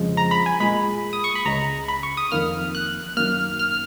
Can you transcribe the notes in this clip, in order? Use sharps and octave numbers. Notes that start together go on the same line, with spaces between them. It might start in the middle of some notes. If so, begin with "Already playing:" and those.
Already playing: F2 C#3 F3 G#3
A#5
B5
G#5
A#2 G#3 B5
D#6
C#6
B5
C#2 C#3 G#3 A#5
B5
C#6
D#6
F2 D#3 A#3 F6
F#6
F#2 D#3 A#3 F6
F6